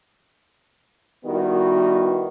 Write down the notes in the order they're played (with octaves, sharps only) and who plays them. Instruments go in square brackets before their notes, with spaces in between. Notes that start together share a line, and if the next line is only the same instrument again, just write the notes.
[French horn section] D#3 G3 B3 E4 F#4